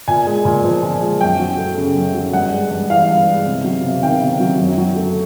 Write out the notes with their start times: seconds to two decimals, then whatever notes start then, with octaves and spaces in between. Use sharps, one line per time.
0.08 A#2 G#5
0.26 G#3
0.45 A#2
0.64 F3
0.83 A#2
1.02 G#3
1.21 F#2 G5
1.39 F#3
1.58 A3
1.77 C#3
1.95 F#2
2.14 F#3
2.33 G2 F#5
2.52 G#3
2.71 G2
2.90 E3 F5
3.09 G2
3.28 G#3
3.46 C3
3.64 F#3
3.84 C3
4.03 D#3 G5
4.22 C3
4.40 F#3
4.59 F#2
4.78 F#3
4.96 A3